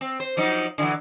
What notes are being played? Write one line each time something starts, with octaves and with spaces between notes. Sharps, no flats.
C4
C5
F3 F#3 D#4
D3 E3 F#3